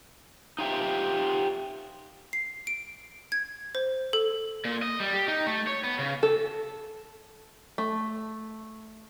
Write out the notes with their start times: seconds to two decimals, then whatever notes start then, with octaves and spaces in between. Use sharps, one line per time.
0.58 D#4 F4 G4 E5
2.33 C7
2.67 D7
3.32 G#6
3.75 C5
4.13 A4
4.65 A#2
4.82 D#5
5.00 G3
5.14 G4
5.28 D#4
5.46 A3
5.67 C#5
5.84 B3
5.99 C#3
6.23 A4
7.78 A3